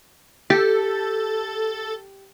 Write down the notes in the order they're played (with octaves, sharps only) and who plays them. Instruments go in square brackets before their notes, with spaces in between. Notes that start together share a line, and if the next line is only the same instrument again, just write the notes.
[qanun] G4 [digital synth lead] A4